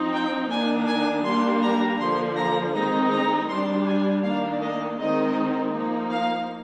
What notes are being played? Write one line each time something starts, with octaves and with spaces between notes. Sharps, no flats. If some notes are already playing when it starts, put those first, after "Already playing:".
Already playing: F3 C4 D#4
G5
D#3 A#3 D4 G#5
G#5
G3 A#3 D4 C6
A#5
D3 F3 A#3 C6
A#5
D#3 G#3 C4 D#4 A#5
A#5
G3 D4 C6
G#5
D#3 A#3 D4 F5
D#5
D#3 G#3 C4 D#4 D#5
F3 A#3 D#4
F5